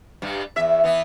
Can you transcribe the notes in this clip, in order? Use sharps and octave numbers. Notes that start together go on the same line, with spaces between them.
G2 G3
E2 E5
E3 B3